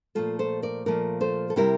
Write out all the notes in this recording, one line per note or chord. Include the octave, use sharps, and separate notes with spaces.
A#2 F3 A3 F4 A4
A4 C5
A#4 D5
A#2 F3 A3 A#4 D5
A4 C5
A4
C3 G3 C4 E4 G4 A#4